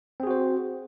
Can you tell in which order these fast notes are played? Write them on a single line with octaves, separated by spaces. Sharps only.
C4 G#4 F#4 C5